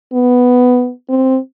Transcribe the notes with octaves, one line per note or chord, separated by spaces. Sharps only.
B3
C4